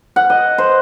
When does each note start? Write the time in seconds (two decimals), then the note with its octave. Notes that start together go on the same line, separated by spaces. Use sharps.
0.16 F#5
0.30 D#5
0.58 C5